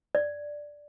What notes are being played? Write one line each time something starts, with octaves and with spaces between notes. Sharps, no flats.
D5